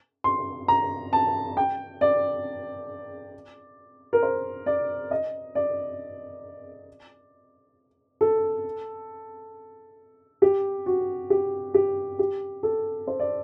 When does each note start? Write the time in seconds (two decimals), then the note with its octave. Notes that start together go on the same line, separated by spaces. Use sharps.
0.24 C6
0.68 A#5
1.13 A5
1.57 G5
2.01 D5
4.13 A#4
4.23 C5
4.66 D5
5.11 D#5
5.55 D5
8.21 A4
10.42 G4
10.86 F#4
11.30 G4
11.74 G4
12.19 G4
12.63 A4
13.07 C5
13.20 D5